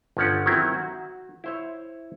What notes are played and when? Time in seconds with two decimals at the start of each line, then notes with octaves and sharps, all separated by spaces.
0.17 G1 F3 C#4 F#5
0.46 D#3 F#3 C4 C#4 E4
0.74 F#4
1.44 E4 C5 C#5